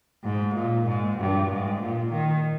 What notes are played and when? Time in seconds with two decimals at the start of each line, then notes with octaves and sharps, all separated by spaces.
0.24 G#2
0.55 A#2
0.86 G#2
1.18 G2
1.50 G#2
1.81 A#2
2.13 D#3